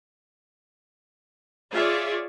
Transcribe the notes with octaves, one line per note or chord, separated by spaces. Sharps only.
F4 G#4 C#5 D5 E5